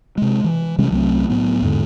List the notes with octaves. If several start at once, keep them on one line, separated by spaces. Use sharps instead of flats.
C3 G#3
E3
C3 G3 G#3 C#4
C2 F#3 A3 C4
A2 F#3 B3
E2 G#2 D3